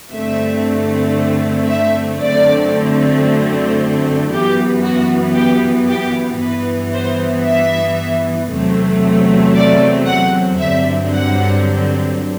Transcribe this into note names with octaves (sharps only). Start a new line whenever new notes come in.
G2 D3 A3 C4 E5
E5
F#2 D3 A3 C4 D5
F#2 E3 B3 G4
F#4
G4
G4
G2 E3 B3 B4
C5
E5
E2 C3 F#3 A3 C4
D5
F#5
G2 D3 F#3 C4 E5
F#5